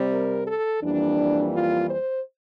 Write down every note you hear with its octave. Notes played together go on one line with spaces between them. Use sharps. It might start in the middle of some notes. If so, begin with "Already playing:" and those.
Already playing: C3 G3 C4
A#4
A4
F2 E3 G3 A#3 D4
F4
C5